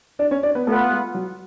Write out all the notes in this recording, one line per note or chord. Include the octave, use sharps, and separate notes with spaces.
D4 D5
C#4 C#5
D4 D5
B3 B4
A3 B3 F4 A4 B4 F#5
G#3 G#4
F#3 F#4